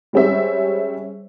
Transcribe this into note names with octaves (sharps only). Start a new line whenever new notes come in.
G3 G#3 C#4 C5 E5